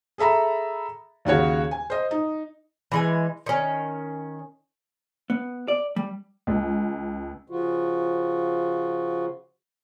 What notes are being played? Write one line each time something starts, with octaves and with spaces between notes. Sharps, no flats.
G#4 A4 E5 A#5 B5
D#2 C#3 F#4 C#5
G#5
C5 D#5
D#4
E3 G#3 G#5
D#3 C#4
B3
D5
G3
C#2
C#3 F3 F4 F#4